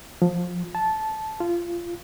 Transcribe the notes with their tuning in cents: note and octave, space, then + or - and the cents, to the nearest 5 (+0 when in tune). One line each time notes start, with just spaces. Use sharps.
F3 +20
A5 -10
F4 -20